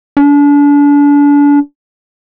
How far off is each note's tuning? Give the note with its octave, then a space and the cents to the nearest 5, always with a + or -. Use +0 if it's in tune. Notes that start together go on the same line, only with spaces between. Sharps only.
D4 -35